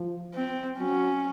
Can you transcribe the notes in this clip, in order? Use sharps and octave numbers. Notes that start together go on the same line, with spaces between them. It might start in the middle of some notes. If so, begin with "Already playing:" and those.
Already playing: F3
C4
F#3 C#4